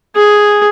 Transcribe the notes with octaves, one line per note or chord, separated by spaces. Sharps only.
G#4